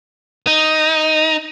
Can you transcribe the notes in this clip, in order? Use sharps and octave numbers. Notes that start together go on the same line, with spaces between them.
D#4